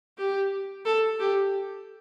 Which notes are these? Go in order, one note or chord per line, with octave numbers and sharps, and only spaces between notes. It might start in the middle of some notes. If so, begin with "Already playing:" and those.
G4
A4
G4